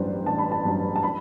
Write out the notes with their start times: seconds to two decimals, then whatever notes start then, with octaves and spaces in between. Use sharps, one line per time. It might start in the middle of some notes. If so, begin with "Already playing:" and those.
Already playing: A1 G2 F#3 B4 C5 D5
0.26 A1 A5
0.38 B5
0.52 A5
0.65 G2 F#3
0.96 A5
1.03 B5